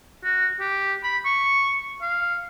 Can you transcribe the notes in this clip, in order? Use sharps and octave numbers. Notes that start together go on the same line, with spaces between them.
F#4
G4
B5
C#6
F5